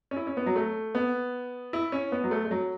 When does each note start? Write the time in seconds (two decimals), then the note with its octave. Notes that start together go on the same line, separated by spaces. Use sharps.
0.11 C#4
0.16 E4
0.27 C#4
0.37 B3
0.46 F#3
0.56 A3
0.95 B3
1.73 E4
1.92 C#4
2.12 B3
2.24 F#3
2.31 A3
2.45 A3
2.51 F#3